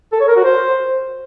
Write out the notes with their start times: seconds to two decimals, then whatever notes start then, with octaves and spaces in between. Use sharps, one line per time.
0.12 A4
0.20 C#5
0.28 A#4
0.36 F#4
0.44 C5